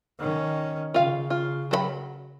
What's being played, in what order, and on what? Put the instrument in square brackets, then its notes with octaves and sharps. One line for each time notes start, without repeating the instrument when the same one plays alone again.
[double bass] D#3 C#4
[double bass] C#3 [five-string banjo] F4 F5
[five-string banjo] F4
F#3 A4 B5